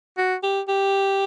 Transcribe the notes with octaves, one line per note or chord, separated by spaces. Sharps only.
F#4
G4
G4